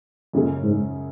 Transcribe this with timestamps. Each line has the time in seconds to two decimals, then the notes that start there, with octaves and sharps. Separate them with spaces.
0.33 F#2 C#3 G#3 C#4
0.63 G#2